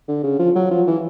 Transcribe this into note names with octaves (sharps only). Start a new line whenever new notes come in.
D3
C#3
F3
F#3
F3
E3